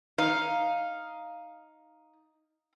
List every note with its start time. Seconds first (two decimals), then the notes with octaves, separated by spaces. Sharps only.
0.18 D#4 F5